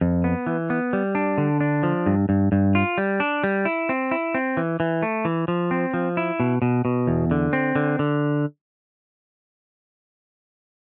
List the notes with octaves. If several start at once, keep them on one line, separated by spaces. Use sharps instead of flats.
F2
B3
E3
B3
G3
D4
D3
D4
F3
G2
G2
G2
F4
G3
D4
G3
E4
C4
E4
C4
E3
E3
A3
E3
F3
C4
F3
E4
B2
B2
B2
E2
D3
C4
D3
D3